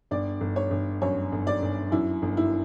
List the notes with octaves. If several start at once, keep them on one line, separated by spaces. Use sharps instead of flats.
G1 D5
G1
C#5
G1
F#2 C#5
G1
D5
G1
F#2 E4
G1
E4